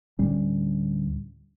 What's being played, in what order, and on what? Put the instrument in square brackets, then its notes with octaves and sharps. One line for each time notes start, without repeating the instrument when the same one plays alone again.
[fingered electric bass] D2 A2 G3 C#4